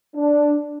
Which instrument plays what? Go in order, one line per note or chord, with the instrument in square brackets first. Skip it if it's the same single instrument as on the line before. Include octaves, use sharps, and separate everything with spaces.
[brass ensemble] D4